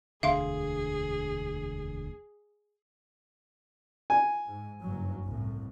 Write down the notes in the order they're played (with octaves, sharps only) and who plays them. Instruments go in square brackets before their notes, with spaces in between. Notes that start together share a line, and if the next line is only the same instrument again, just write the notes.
[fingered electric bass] E1 D2 D3 [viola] G#4 [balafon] E5 F5 C6
[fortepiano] G#5
[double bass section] G#2
F#1 G2 F#3
C2 A2